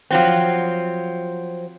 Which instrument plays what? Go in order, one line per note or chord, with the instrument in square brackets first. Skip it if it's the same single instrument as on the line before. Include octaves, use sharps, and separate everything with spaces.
[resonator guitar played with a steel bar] F3 F#3 C4